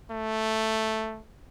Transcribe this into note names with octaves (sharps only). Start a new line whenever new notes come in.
A3